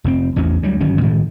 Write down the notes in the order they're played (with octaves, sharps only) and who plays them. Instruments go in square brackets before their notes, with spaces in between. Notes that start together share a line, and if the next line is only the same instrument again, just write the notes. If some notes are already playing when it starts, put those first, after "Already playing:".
[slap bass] F1 A2 C4
A1 E2 C#4
D2 F#3 G3
G1 D#3 F#3 C#4
A2 D#3 F3 G#3